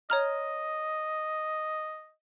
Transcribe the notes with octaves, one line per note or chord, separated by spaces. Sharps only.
C#5 D#5 A#5 F6